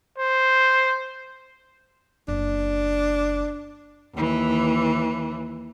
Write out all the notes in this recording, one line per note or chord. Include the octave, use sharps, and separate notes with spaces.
C5
F#1 D4
D#2 E3